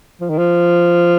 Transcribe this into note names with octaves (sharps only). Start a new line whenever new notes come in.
F3
D#3
F3